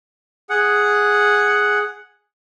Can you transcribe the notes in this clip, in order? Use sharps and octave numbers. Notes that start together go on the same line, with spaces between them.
G#4 F#5